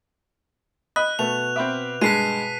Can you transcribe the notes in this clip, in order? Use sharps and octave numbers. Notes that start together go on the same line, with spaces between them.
D#5 B5 F#6
B2 A3 C#6 F7
C4 B4 E5 D6 F6
G2 G#3 G#4 A5 B6 C7 D#7